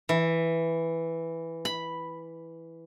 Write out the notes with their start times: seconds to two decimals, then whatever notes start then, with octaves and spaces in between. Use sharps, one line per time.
0.09 E3
1.65 B5